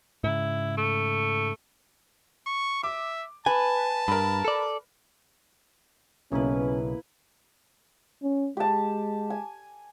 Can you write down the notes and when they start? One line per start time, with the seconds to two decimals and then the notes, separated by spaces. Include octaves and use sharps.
0.24 G#2 C#3 E4
0.77 A3
2.47 C#6
2.83 E5 D6
3.46 B4 G#5 A5
4.08 G2 A#4 B5
4.45 A4 D5
6.32 B1 C#3 A#3 C#4 E4 B4
8.23 C#4
8.57 G#3 G4 A5
9.30 G#5